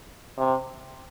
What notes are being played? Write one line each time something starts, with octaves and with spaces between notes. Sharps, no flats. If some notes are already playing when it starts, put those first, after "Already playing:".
C3